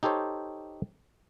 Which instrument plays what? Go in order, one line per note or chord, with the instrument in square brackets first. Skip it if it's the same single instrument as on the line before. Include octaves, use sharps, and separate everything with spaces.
[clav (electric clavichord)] D#4 G4 A4 C5 C#5